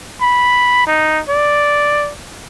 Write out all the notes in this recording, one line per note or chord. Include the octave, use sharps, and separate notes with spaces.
B5
D#4
D5